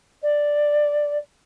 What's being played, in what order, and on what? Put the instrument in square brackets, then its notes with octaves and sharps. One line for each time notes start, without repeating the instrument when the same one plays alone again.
[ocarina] D5